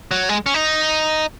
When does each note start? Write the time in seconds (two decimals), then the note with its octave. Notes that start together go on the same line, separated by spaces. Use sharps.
0.11 F#3
0.29 G#3
0.46 C#4
0.54 D#4